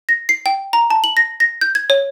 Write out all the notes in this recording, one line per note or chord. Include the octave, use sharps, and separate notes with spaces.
A#6
C7
G5
A#5
A5
F#7
A#6
A#6
G6
G#6
C#5